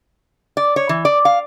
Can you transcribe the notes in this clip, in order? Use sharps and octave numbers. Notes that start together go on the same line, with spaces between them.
D5
C#5
E3
D5
F5